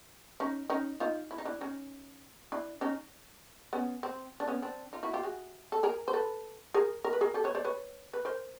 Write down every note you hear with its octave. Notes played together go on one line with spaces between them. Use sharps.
C#4 D#4
C#4 D#4
D#4 F4
E4
D#4
D4 E4
C#4 D#4
D4 E4
C#4 D#4
B3 C#4
C4
D4
B3 C#4
C4 D4
D#4 F4
E4 F#4
F4 G4
F#4 G#4
A4
G#4 A#4
C5
A4 B4
G#4 A#4
A#4
B4
G#4 A#4
G4 A4
B4 C#5
C5 D5
B4 C#5
B4
A#4 C5